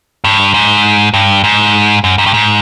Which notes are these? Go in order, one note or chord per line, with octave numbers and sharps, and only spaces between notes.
G2
G#2
G2
G#2
F#2
F#2
G2
G#2